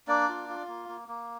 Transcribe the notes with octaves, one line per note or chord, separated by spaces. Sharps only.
A#3 D4 D5
F4
F4
A#3
A#3
A#3